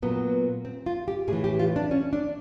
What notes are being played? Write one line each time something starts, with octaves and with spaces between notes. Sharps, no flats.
A#2 F#3 B3
C4
F4
G4
A2 G#4
E3
G4
F4
D4
C#4
D4